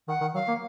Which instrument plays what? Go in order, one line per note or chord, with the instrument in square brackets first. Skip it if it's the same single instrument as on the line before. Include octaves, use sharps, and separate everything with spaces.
[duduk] D#3 [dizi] F#5
[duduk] D#3
[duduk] F#3 [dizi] F5
[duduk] A#3